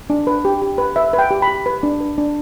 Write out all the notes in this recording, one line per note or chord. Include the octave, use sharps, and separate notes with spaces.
D4
B4
G4
G4
B4
B4 E5
B4
G5
G4
B5
G4
B4
D4
B4
D4